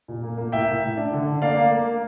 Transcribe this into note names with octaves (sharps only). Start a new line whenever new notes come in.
A#2
A#3
A#3
A2 E5 G5
A2
A2
D4
D3
D4
A#3 D5 F5
A#3
A#3